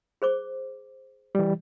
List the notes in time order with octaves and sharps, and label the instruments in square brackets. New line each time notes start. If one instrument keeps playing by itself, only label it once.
[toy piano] G#4 C5 D6
[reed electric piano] E3 G3